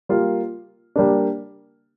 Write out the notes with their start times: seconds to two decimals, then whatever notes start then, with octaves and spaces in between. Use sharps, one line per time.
0.09 G3 A#3 F4
0.96 G3 A#3 D4